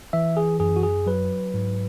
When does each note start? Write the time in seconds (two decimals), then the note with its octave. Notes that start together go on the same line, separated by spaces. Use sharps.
0.13 E3 E5
0.37 G#4
0.60 F#2 G#4
0.76 F#4
0.83 G#4
1.06 F#3 B4
1.54 G#2